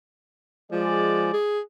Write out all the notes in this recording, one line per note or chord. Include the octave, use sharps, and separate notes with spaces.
F3 G#3 D5
G#4